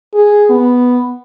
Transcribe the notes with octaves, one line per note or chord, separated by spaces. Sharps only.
G#4
B3